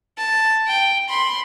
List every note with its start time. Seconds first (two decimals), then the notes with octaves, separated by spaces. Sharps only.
0.18 A5
0.68 G5
1.09 B5 C6